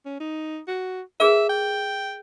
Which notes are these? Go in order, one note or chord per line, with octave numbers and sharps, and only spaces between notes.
C#4
D#4
F#4
G#4 A#4 B4 E5
G5